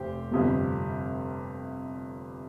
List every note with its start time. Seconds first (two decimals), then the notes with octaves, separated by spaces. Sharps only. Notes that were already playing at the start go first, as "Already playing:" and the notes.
Already playing: F1 G4 C5
0.31 G1 F2 C3 G3